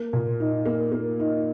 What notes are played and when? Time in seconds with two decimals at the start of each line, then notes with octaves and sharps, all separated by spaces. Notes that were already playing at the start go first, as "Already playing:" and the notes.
Already playing: A#3
0.13 A#2
0.40 D#4
0.65 A#3
0.92 A#3
1.20 D#4